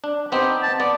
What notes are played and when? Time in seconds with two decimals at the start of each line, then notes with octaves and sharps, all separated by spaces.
0.04 D4
0.32 B3 C4 D#4 G4
0.63 A5
0.80 B3 D5